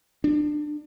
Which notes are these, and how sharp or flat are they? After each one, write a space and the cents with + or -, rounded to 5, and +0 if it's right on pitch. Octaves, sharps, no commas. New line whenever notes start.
D4 +25